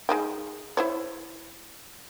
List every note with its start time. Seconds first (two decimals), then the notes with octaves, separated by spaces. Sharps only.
0.09 G#3 D#4 G5
0.77 E4 C5 C#5